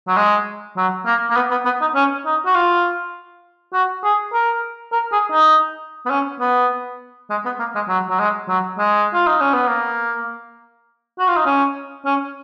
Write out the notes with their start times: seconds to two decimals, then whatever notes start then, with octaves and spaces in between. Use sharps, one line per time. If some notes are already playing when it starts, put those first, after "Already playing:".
0.08 F#3
0.17 G#3
0.78 F#3
1.06 A#3
1.30 A#3
1.36 B3
1.51 B3
1.65 B3
1.81 D#4
1.95 C#4
2.26 D#4
2.46 F#4
2.55 F4
3.74 F#4
4.04 G#4
4.33 A#4
4.92 A#4
5.12 G#4
5.32 D#4
6.06 B3
6.11 C#4
6.40 B3
7.30 G#3
7.45 B3
7.59 A#3
7.75 G#3
7.89 F#3
8.10 F#3
8.20 G#3
8.49 F#3
8.79 G#3
9.14 F4
9.27 D#4
9.41 C#4
9.54 B3
9.68 A#3
11.19 F#4
11.28 F4
11.36 D#4
11.46 C#4
12.05 C#4